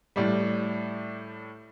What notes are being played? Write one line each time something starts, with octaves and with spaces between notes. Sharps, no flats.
A2 G3 D5